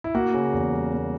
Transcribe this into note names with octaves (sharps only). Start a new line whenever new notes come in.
E4
A#3 F#4
C#3
E2
G3
A#3